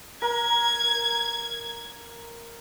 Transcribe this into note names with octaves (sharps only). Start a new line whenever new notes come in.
A#4 A#5 G#6